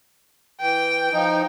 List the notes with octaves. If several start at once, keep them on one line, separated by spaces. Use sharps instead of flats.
E3 G5
F3 D#4